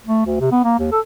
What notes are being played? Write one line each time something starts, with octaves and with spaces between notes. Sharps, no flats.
A3
D2
C3
B3
A#3
D#2
A4